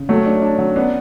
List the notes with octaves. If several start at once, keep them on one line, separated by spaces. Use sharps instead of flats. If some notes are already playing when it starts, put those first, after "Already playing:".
Already playing: C#3
F#3 A3 C#4
D4
D4
F#3
B3 C#4 D4